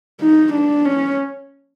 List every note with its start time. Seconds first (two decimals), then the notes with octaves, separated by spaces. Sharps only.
0.21 D#4
0.53 D4
0.85 C#4